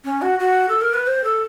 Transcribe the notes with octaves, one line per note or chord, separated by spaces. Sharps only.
C#4
F#4
F#4
A4
A#4
B4
C5
A4